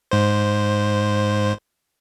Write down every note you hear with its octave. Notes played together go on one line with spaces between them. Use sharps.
G#2 C5